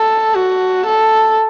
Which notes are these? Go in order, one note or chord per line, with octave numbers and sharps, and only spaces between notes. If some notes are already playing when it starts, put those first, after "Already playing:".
Already playing: A4
F#4
A4